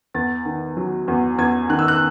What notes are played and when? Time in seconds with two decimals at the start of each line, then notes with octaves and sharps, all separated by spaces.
0.14 E2 A6
0.45 D#3
0.77 F#3
1.08 E2
1.38 E2 G#6
1.69 D#3 F#6
1.79 E6
1.88 F#6